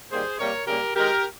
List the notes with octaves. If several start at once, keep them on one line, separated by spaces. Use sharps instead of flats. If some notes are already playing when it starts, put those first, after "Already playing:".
D#3 G3 A#3 G#4 C5
C3 G3 A#3 A#4 C#5
C#3 G3 A#3 G4 A#4
D#3 G#3 G4 A#4